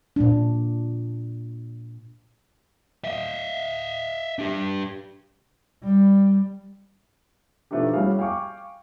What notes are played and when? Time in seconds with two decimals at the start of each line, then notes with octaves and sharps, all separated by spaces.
0.16 A#2 D4
3.04 D#5 E5
4.39 D4 G4
5.84 G3
7.71 B2 F3 A3 D4 D#4 G4
7.94 G3 C#4 E4 F#4 G#4 F5
8.19 F5 G5 G#5 C#6 D6